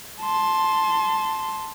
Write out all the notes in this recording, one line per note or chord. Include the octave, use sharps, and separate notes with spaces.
A5 C6